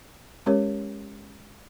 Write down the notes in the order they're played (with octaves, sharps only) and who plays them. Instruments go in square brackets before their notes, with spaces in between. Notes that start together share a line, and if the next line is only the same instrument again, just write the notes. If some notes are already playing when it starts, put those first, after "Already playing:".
[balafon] G#3 C#4 G4 A#4 C#5